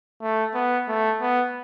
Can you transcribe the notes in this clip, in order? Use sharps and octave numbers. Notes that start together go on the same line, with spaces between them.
A3
B3
A3
B3